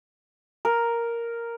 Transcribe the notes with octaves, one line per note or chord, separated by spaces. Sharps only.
A#4